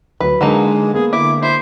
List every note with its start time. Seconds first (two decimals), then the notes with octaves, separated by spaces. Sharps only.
0.20 D2 F#3 B4
0.41 D3 F#3 G#3 A#3 D#4
0.94 A#3 B3 G#4
1.13 D3 E4 D6
1.43 E4 C5